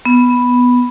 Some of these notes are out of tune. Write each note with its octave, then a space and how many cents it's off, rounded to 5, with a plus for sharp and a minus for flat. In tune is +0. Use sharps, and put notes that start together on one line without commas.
B3 +0